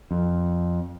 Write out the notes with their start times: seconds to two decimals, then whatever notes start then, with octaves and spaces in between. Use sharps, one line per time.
0.11 F2